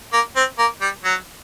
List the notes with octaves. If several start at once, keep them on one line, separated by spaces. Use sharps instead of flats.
A#3
C4
A#3
G3
F#3